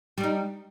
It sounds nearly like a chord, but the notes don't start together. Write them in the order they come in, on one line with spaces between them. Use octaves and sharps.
G3 D4 D#4